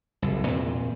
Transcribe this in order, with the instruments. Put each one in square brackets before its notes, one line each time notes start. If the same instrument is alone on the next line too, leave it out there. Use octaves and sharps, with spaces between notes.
[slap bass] F#1 C2
E2 A#2 C4